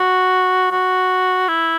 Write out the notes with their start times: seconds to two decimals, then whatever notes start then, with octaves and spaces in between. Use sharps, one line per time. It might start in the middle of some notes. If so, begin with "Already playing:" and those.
Already playing: F#4
0.71 F#4
1.48 E4